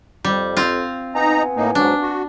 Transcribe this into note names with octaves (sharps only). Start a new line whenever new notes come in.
F2 G3
C4 F4
B3 D#4 G#5 A#5
A2 A#3 D#4
G#2 F#3 D4
F#4